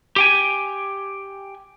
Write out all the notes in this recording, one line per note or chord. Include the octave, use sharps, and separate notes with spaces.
G4 G5 G#5